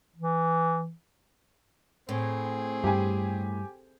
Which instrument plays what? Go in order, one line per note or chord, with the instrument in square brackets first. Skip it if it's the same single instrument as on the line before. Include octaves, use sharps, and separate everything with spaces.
[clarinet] E3
[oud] A2 [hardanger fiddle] C4 G#4
[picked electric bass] G2 [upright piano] G4 G#5